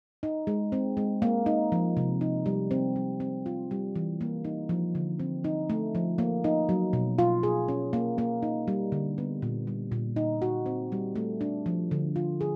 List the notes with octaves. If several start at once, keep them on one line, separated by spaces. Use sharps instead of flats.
D#4
G#3
C4
G#3
A#3
D#4
F3
C3
D#4
G3
C4
G3
C4
F4
G3
E3
A#3
D#4
F3
D3
C4
D#4
A3
F3
A#3
D#4
F#3
B2
F4
G#4
C#4
A#3
A#3
D#4
G3
D3
B3
A#2
G3
A#2
D#4
F#4
C4
G3
A3
D4
F3
D3
F4
G#4